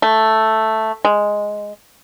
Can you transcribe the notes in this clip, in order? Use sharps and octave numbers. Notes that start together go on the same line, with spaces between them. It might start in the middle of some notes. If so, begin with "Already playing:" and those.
A3
G#3